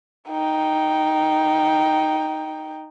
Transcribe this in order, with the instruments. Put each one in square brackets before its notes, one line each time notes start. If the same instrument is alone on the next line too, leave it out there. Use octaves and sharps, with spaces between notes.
[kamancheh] D#4 G5